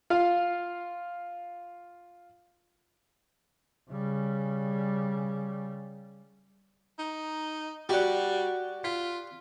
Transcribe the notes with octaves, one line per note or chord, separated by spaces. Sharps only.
F4 F5
C#3 G3
D#4
G3 F#4 G4 D5 F#5
F4 B6